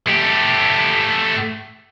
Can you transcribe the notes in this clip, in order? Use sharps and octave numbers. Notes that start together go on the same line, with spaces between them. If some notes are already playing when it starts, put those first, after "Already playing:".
A3 G4